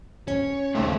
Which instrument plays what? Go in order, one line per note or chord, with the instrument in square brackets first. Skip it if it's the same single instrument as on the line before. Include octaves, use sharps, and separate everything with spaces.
[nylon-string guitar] C#4 [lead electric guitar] C#5
[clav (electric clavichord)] D#2 C3 [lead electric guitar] G#3 [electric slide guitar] A3 G#4 A4